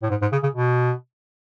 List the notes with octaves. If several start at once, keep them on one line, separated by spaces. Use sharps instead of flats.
A2
G#2
G#2
C#3
C#3
B2